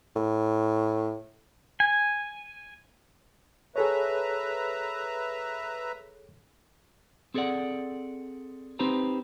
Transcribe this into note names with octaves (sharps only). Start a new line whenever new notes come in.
A2
G#5
G#4 A4 B4 C#5 E5 A#5
C4 G#4 A4 C5 D5 F#5
C4 D#4 G4 B4 C5 A#5